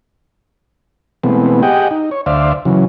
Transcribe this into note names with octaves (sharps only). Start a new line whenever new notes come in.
B2 E3 G#3 A3 B3 C4
G4 G#4 D#5 F#5 G5
D#4
C#5
D2 C5 D5 E5 F5
C#3 E3 F#3